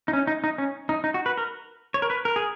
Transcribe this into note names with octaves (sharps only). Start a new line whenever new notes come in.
D#4
C#4
D#4
D#4
C#4
D#4
D#4
F#4
B4
A#4
C#5
A#4
B4
A#4
G#4